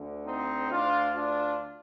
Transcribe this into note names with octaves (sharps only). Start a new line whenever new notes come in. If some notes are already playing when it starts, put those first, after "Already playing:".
Already playing: D2 D3
C4 D#4
D2 D3 D4 F4
D4 F4